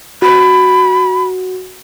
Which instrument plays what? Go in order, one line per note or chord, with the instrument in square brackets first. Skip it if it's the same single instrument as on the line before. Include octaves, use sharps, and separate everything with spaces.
[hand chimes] F#4 [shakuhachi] B5